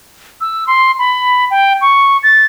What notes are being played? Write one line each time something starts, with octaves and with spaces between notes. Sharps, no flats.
E6
C6
B5
G5
C#6
A6